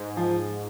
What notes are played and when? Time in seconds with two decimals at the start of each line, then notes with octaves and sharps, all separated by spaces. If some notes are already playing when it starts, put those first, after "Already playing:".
Already playing: G#2
0.17 F3